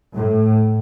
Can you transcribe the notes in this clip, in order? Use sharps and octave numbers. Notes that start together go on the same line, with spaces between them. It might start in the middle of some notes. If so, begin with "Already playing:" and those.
A2